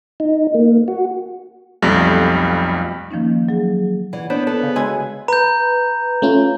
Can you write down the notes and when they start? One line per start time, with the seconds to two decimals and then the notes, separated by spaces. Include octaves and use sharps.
0.20 D#4
0.54 A#3
0.88 F#4
1.82 B1 F2 G3 A3 A#6
3.11 D#3 F3 A#3 C#4 D#4
3.49 F#3 G#4
4.13 E3 D5 F#5
4.30 B3 D4 C5 C#5
4.47 B3 A4
4.63 C#3 C#5 F5 G#5
4.76 G#3 D4 F#4 G#5 E6
5.28 B4 A#5 G6
6.22 A3 C#4 F4